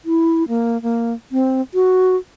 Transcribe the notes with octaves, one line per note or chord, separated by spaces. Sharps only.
E4
A#3
A#3
C4
F#4